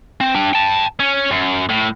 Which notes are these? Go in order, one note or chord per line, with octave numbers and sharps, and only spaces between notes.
C4
D4 G5
G5 A5
C#4
F#2
A2